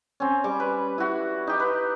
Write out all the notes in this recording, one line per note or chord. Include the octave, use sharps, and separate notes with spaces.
C4 C#4
G3 C#6 D6
B4
E4 F#4
D#4 G4
B4